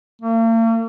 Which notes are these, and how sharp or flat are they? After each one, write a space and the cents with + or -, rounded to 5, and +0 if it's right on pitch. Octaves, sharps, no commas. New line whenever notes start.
A#3 -45